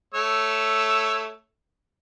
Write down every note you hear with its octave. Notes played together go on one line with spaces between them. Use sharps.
A3 C#5 E6